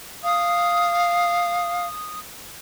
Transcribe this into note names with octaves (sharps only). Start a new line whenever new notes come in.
F5 D#6